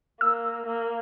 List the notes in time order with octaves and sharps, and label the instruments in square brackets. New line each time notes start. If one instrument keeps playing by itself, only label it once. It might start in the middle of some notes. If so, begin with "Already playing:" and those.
[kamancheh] A#3 [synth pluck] E6
[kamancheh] A#3